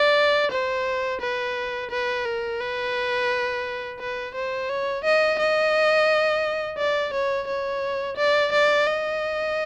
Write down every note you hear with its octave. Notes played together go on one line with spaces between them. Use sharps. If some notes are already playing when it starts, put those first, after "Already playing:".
Already playing: D5
C5
B4
B4
A#4
B4
B4
C5
C#5
D#5
D#5
D5
C#5
C#5
D5
D5
D#5